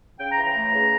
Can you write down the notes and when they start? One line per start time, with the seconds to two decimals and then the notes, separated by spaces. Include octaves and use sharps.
0.19 C#3 G5
0.31 A#5
0.37 E3
0.43 A#5
0.56 A3
0.74 C#3